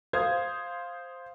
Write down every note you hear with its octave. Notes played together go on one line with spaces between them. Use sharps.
C5 F5 D#6 G#6